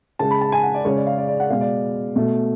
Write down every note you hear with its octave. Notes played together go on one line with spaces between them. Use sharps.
C#3 G#3 A5
B5
A5
G#5
F#5
D5
C#3 G#3 C#5
D5
F5
D5
D5
F#5
B2 G#3 F5
D5
B2 A3